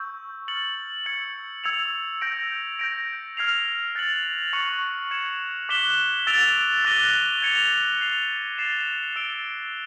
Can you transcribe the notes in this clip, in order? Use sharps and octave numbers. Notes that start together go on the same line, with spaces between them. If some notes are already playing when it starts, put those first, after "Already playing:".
Already playing: C#6 E6 G6
F6 A6 C#7 F#7
E6 G#6 C#7 F#7
E6 G#6 C#7 F7
E6 G6 A#6 D7
G6 A#6 D7
F6 G#6 C7 F7
F#6 A6 C#7 F#7
C#6 F#6 A6 C#7
G#6 C#7 E7
D6 F#6 B6 E7 G7
E6 A6 D7 F7
D6 F#6 A#6 D#7 G7
G#6 C#7 F7
G6 C7 F7
A6 C7 E7 G7
E6 A6 D7 G7